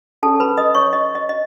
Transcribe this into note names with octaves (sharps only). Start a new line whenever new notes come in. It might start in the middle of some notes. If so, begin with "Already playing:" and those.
C#4 G#4 A4 C#5 A5
B4 B5
D#5 D#6
C#5 C#6
D#5
D#5
D#5